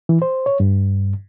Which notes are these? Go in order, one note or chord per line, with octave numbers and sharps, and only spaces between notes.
E3
C5
C#5
G2